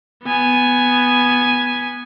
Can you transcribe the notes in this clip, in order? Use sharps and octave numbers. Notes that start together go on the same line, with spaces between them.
B3 G#5